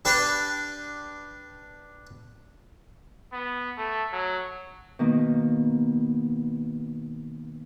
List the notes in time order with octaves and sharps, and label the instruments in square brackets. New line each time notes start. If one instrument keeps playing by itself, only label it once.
[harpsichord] D4 G4 B4
[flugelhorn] B3
A3
F#3
[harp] B2 D#3 A#3